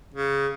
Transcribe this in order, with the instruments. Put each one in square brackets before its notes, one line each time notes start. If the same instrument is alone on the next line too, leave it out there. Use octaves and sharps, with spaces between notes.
[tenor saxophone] C#3